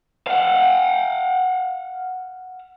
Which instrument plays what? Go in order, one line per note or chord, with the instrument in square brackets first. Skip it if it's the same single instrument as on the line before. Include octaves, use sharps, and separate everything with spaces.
[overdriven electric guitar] F5 F#5